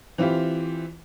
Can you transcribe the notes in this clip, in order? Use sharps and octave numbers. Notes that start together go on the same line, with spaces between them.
E3 C4 E4 F4 G4